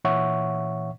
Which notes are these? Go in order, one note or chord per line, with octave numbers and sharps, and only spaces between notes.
A#2 E3 C#5 E5 F#5 C#6